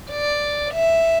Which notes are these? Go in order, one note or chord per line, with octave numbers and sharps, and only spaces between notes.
D5
E5